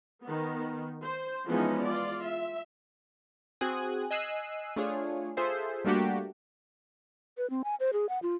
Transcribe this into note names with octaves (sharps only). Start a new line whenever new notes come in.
D#3 B3
C5
E3 F3 G#3 B3 C#4 D#4
F4 D5
E5
C4 F#4 G#4 G#5 D#6 F#6
D#5 G#5 E6 F#6 C7 D#7
A3 D4 F4 G#4 C#5
F4 G#4 A4 C5 E5
G3 A3 A#3 D4 F#4 G4
B4
C4
G#5
C5
G#4
F#5
F4